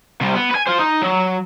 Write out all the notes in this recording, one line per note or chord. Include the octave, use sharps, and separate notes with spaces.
C3 G3
B3
B4 G#5
F4 C5
D#4
F#3